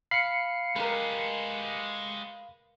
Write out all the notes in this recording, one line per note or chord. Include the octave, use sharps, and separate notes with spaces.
F5 B5 C7 C#7
G#3 G4 A#4 B4